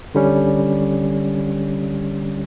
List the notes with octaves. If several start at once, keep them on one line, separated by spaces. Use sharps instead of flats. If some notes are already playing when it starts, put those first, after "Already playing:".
D3 G3 C#4